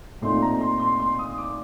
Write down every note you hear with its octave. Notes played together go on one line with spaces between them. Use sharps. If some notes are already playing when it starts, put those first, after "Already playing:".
A#2 A3 C4 D#4 C6
A#5
C6
C6
C6
D#6
D6